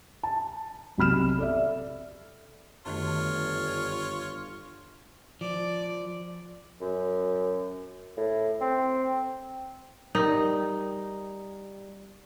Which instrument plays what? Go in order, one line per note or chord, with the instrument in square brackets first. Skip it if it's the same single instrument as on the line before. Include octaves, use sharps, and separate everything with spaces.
[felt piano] A5
B1 C3 B5 F6 E7
A4 D5 E5
[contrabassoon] G1 [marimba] F#2 D#3 A3 [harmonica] F4 C#5
[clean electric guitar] F3 [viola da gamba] D5
[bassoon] F#2
A2
C4
[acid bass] G3 [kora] D#4 [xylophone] A#4